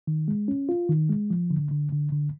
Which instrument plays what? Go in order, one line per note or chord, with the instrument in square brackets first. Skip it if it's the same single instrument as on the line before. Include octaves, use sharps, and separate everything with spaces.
[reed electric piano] D#3
G#3
C#4
F4
D#3
G#3
F3
D3
D3
D3
D3